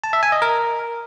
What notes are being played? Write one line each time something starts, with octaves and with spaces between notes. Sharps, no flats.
A5
E5
G#5
D#5
A#4